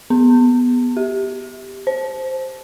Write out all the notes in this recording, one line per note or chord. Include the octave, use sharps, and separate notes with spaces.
B3
G4
C5